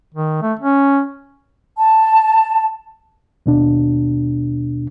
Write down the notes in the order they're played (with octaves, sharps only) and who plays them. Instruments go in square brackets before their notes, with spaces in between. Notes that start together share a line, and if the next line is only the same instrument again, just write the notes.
[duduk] D#3
A3
C#4
[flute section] A5
[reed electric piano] D#2 B2 D4